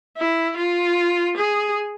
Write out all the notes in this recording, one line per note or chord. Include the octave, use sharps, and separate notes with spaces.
E4
F4
G#4